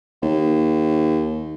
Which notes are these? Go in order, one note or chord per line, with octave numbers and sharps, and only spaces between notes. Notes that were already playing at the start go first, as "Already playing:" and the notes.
D#2